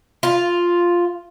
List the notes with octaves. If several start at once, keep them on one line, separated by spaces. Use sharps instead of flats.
F4